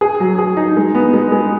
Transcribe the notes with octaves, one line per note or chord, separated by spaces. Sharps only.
G#4
F#3
G#4
D#4
G#3
B3
G#3
G#3